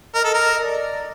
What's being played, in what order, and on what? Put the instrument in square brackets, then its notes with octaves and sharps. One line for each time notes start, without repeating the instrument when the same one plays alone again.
[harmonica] A#4 [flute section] D#5
[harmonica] A4
A#4
[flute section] D5